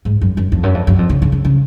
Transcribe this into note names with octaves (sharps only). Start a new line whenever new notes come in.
G#2
F#2
F#2
F2
F#2
F2
F#2
F2
C#3
C#3
C#3
C#3